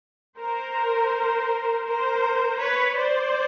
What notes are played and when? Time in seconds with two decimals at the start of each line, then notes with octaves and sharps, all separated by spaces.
0.37 A#4 C5
1.85 A#4 C5
2.59 B4 C#5
2.96 C5 D5